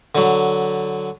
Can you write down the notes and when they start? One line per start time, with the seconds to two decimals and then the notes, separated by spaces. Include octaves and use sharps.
0.15 D3 F#3